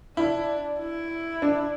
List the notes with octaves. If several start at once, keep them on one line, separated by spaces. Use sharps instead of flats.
D4 E4
E4
D4